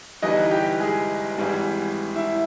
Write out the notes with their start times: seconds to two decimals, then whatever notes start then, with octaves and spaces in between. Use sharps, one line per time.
0.22 G1 G2 E3 G3 D#4 D#5
0.51 G4 G5
0.80 G#3 G#4
1.38 G#1 G#2 E3 G3
2.16 E4